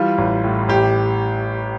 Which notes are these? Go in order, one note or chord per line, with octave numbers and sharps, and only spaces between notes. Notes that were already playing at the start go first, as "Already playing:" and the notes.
Already playing: E3 G3 F4
A1
A2
A1 G4